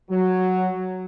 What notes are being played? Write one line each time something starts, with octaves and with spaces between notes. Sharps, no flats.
F#3